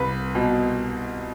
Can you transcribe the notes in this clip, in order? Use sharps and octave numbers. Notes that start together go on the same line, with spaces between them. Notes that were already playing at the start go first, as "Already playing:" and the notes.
Already playing: C2 B4
B2